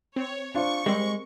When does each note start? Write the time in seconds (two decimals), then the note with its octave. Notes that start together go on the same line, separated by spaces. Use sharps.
0.16 C4 C#5
0.55 D4 F4 C5 C#6
0.86 G3 G#3 C4 A#4